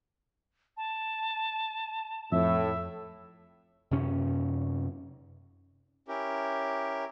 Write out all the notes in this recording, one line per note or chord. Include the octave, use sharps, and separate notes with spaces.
A5
F2 A2 E5
F#2 C3 C#4
C#4 E4 G4 A#4